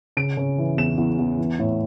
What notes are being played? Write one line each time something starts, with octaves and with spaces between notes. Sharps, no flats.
C#3 D7
C#3
E3
E2 E7
E2
E2
E3
A2